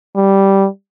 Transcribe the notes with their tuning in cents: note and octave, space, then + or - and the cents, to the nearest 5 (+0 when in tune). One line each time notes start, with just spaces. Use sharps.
G3 -5